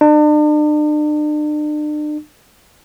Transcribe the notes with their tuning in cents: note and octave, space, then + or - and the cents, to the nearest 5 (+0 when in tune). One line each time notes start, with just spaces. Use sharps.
D4 +40